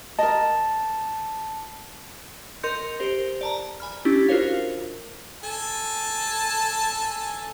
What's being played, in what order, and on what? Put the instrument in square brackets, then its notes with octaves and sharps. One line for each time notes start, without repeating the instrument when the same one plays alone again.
[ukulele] A#4 D#5 [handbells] A5
[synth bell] A#4 D#5 C6 G6 C#7
G4 A#4 C5
D5 A5 A#5
G#5 B5 F6
C#4 D4 E4 G4
F4 F#4 A#4 C5 C#5 F5
[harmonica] A4 G#5 A5